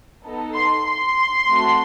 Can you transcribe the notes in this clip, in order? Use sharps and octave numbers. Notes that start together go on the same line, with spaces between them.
B3 D#4 A4
C6
C6
A3 C4 F#4 A4